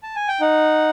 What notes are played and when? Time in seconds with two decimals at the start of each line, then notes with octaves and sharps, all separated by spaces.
0.03 A5
0.16 G#5
0.28 G5
0.41 D#4 F#5